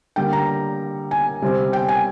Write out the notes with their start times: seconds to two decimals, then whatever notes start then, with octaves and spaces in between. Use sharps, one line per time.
0.16 D3 G3 A#3 G5
0.33 A#5
1.11 G#5
1.42 C3 G3 C4
1.73 G5
1.89 G#5